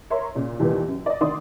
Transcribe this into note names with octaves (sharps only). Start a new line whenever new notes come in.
A#4 C#5 E5 C6
A#2 C#3
D#2 A#2 E3 G3 B3
F#2
D5 D#5
D2 D#3 D5 C6 D#6